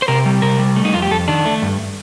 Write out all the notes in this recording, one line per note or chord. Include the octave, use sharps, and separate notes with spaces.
C5
C3 A#4
G3
C3 A#4
G3
A3
D#4
F2 F4
G4
F2 A4
D#3 D4
A3
G2